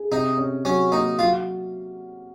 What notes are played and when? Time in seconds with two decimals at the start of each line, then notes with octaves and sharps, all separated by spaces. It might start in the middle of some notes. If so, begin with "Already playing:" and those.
Already playing: G#4
0.11 C3 D#4
0.38 C#4
0.65 F#3 C#4
0.92 A#3 D#4
1.19 F#3 F4